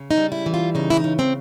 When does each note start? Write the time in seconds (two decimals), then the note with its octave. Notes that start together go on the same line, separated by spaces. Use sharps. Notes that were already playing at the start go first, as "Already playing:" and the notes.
Already playing: C#3
0.11 D#4
0.17 G3
0.32 E4
0.46 E3
0.54 F4
0.75 C#3 D#4
0.90 E4
0.97 D#4
1.04 C#3
1.19 C4